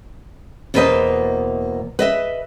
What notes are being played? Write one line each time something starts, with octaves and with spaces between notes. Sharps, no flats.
E2 B2 A#3 B4 C5 D#5
B4 D#5 E5